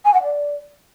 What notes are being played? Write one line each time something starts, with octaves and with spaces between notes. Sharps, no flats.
G#5
F#5
D5